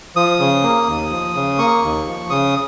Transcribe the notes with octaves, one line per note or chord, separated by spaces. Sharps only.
F3 D#6
C#3
A#3
D#2
F3
C#3
A#3 C#6
D#2
F3
C#3 D#6